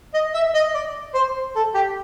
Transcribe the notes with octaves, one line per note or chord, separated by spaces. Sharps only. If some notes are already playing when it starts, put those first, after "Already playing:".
D#5
E5
D#5
D5
C5
A4
G4